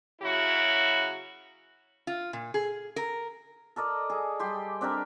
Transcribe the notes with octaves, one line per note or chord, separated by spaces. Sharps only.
C#3 F#3 E4 F#4
F4
A#2
G#4
A#4
A4 A#4 D5 D#5
G#4 A4
G3 G4 C6
C4 D4 G4 A#4